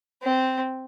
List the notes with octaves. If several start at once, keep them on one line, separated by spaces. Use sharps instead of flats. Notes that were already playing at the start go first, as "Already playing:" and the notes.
C4